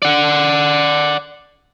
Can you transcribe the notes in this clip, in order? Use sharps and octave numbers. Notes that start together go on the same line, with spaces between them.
D5 F#5